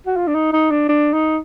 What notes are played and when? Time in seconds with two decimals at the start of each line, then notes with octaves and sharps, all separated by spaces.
0.06 F#4
0.16 F4
0.27 D4
0.34 D#4
0.53 D#4
0.71 D4
0.89 D4
1.13 D#4